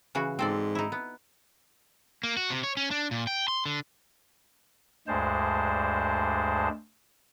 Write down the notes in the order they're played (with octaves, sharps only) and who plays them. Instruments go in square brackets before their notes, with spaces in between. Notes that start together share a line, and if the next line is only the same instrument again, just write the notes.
[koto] C#3 E3 F#4
[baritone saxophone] G#2 [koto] C4 A4 D5
[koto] D#4 E4
B3
[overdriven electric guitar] A#3
F#4
C3
C#5
C#4
D4
A#2
G5
C6
D3
[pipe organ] D2 G2 G#3 C5 A5